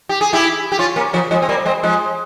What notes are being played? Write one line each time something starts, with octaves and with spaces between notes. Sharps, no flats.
G4
G#4
E4 G4
G4
C#4 F4
A#3 C#4
C#3 F3
F3 G#3
C4
G3 A#3
G#3 C4
F3 G#3